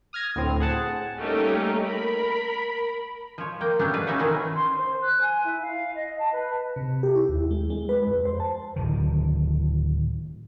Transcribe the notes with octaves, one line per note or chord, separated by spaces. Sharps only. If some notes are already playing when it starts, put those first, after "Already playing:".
D#6 F6 G#6 A#6
D2 A2 C4
G#4 F#5 A5
G3 A3 A#3 C#4 D#4 G4
A#4 B5
F3 C#5
A#3 G5
A3 B3 C#4 D4 G4
B4 D5 F5
C#4 D#4 E5 F#5
C3 D#3 E3 A3 C#4 D4
C6
C5
F#6
G#5
E4
F5
D#5
A5
B4
C3
G4
E4
D#2
G#3
G#3
B4
F2
C5
A5
D1 D#3